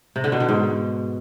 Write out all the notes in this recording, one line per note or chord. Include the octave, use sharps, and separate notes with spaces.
C3
D3
B2
D3
G#2